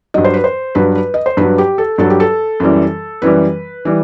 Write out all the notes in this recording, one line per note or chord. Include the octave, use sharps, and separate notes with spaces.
G2 F#3 D#5
C5
B4
C5
G2 F#3 B4
B4
D#5
C5
G2 F#3 B4
G4
A4
G2 F#3 A4
G4
A4
F#2 E3 G3
F#2 E3 G3 B4
E3 G3